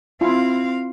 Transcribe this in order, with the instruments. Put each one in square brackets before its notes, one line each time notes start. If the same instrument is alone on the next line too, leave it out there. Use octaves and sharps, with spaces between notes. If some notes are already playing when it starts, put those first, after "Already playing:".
[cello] C4 F5 [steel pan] E4 F4